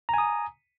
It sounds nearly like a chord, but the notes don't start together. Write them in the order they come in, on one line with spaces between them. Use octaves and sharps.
A#5 G#5 D#6